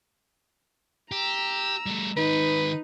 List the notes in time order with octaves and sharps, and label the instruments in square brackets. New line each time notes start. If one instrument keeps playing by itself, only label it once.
[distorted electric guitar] G4 [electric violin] A#5 E6
[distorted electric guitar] G3 A3
[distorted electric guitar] D#3 G#3 [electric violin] D#4 [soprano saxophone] B4